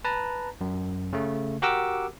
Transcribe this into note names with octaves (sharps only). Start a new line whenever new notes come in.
B4 A5 A#5
F#2
C#3 A3
F#4 G4 A#4 F#5 D6 E6